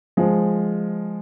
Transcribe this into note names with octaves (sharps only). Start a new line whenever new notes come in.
F3 G#3